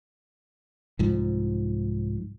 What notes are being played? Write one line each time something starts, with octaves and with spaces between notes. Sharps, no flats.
C2 G#2 F3